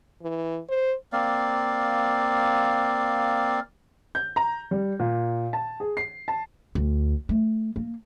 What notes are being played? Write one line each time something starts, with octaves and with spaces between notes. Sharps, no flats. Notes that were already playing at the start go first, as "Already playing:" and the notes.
E3
C5
A#3 C4 D5 F5
G6
A#5
G3
A#2
A5
G#4
C7
A5
D2
A3
A#3